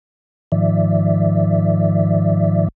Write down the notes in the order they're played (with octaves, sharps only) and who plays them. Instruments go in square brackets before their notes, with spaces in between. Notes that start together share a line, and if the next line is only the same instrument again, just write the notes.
[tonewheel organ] G#2 D#3 F3 D5 E5